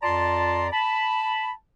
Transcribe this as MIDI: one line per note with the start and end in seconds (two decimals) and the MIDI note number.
0.03 0.68 41
0.03 0.68 65
0.03 0.68 74
0.03 0.68 81
0.03 0.68 82
0.03 0.68 84
0.73 1.52 81
0.73 1.52 83